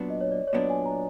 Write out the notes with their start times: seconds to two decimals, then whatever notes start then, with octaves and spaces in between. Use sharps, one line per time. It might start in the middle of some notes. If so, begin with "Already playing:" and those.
Already playing: A#2 F#3 B3 D4
0.10 D#5
0.21 C#5
0.32 D5
0.47 C#5
0.53 A#2 F#3 B3 D4 D5
0.70 G#5
0.86 A#5